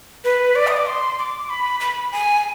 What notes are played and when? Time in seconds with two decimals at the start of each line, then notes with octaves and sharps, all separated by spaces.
0.24 B4
0.55 D5
0.67 D#6
0.77 D6
0.87 C6
1.19 D6
1.49 B5
1.80 B5
2.12 G#5